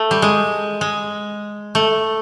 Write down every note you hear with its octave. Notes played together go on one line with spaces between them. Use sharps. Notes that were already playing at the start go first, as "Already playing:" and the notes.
Already playing: A3
G3
G#3
G#3
A3